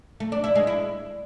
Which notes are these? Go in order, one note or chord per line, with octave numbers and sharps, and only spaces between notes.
A3
D4
E4
G#3
E4